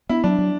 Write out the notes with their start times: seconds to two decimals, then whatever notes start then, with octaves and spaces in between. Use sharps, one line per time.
0.09 B3 E4
0.24 F#3 D4
0.38 F#3